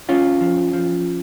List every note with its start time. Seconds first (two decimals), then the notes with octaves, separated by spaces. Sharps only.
0.08 F#2 C#4 F4
0.41 F3
0.73 F3